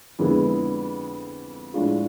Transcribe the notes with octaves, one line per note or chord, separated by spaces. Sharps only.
F2 D3 G#3 B3 E4
A2 F3 G#3 D4 F4